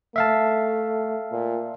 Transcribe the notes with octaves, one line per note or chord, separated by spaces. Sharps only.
A3 E5 F5 A5
A#2